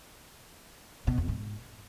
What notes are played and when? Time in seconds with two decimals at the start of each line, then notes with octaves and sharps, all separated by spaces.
1.07 B2
1.18 F2
1.28 G#2